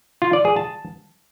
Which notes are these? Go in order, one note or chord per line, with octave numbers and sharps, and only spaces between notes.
F4
D5
G#4
A5